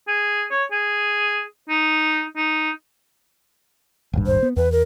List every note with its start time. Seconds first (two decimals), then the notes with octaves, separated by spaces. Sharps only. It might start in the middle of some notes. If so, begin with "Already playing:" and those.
0.08 G#4
0.51 C#5
0.71 G#4
1.69 D#4
2.36 D#4
4.13 D#1 G#1 G2
4.26 C5
4.43 B3
4.56 E2 B4
4.72 A#4